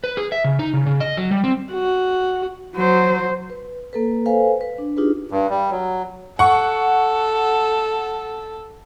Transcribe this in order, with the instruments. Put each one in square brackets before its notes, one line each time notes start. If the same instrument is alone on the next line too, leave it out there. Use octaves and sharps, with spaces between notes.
[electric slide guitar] B4
G#4
E5
C#3
D#4
C#3
C#3
D#5
F#3
G3
C4
[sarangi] F#4
[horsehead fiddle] F#3 C5
[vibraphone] B4
A#3 A4 B4
A4 B4 C5 F5 G#5
B4
D4
D4 D#4 F4 G4 G#4 B4
[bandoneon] G2
G3
F#3
[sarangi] A4 [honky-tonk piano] F#5 C#6